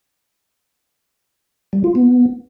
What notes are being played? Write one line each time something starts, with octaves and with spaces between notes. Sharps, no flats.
G3
F4
B3